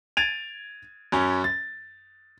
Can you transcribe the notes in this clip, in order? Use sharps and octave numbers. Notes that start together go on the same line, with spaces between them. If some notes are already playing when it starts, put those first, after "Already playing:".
G#6 A6 D7 D#7 F7
F#2 C#4
A6